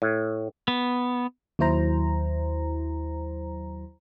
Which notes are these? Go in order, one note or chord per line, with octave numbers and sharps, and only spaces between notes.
A2
B3
D#2 F#3 E4 C5 A#5